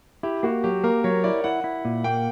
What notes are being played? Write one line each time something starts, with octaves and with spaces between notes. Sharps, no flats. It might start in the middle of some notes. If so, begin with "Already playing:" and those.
E4 G4
A#3 F#4
F#3 G4
A#3 A#4
F#3 C#5
E4 D5
E4 F#5
E4
A#2
A#3 G5